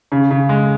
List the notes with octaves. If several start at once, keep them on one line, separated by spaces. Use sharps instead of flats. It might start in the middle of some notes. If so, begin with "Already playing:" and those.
C#3
C#3
G#3